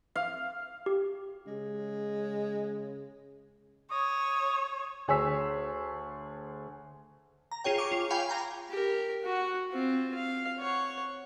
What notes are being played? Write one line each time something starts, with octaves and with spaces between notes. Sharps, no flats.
F5
G4
C#3 G#3
C#5 D#6
D2 G#4 C#5 E6 B6
A#5
F4 G#4 C#5 G5
C#6 D6
F4
F5 G5 G#5 B5
G5 A#5
G4 A#4
F#4 F#5
C4 F4
F5
C#5 F#5